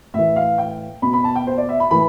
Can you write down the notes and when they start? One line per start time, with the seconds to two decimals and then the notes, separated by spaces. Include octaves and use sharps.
0.14 A2 E3 E5
0.36 F5
0.58 G5
1.02 B2 B5
1.13 B5
1.24 A5
1.35 G5
1.47 C5
1.58 D5
1.69 E5
1.80 B5
1.91 A2 E3 B5